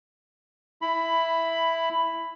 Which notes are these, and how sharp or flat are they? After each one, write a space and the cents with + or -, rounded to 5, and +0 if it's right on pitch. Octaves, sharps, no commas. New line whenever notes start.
E4 +0 B5 +10